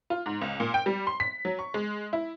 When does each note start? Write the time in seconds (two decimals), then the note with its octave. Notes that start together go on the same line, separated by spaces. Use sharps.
0.10 F4
0.26 G#2
0.42 C#2
0.60 A#2
0.74 G5
0.86 G3
1.07 C6
1.20 B6
1.45 F#3
1.59 C#6
1.74 G#3
2.13 E4